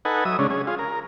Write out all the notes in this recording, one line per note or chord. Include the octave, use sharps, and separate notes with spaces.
D#4 A4 B4 F#5 G#5
F#3 E5 D#6
C#3 G#3 C#4 D4
C#4 G#4
F4 G#4
A#4